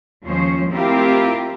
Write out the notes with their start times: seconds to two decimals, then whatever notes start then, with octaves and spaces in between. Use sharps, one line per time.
0.24 D#2 F3 G#3 C#4 C5 C#5
0.70 A3 C4 E4 F4 G4 A#4